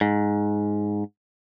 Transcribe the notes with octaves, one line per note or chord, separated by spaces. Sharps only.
G#2